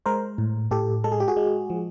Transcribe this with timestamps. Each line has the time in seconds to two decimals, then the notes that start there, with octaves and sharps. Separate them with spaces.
0.06 G#3 A#4 C5
0.38 A2
0.71 A2 G4 A4
1.04 G#3 A4
1.12 G#4
1.20 G4
1.28 F#4 G#4
1.37 G#3
1.70 F3